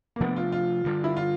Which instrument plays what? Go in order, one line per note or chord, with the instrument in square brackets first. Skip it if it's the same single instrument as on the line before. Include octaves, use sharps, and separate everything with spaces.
[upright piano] A#3
[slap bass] C3 F3 A3 D4 [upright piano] B3
[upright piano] F4
F4
[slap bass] G2 D3 G3
[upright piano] E4
F4